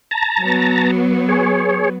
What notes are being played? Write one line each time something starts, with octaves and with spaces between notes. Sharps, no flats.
A5 A#5
F#3 B3
G#4 C#5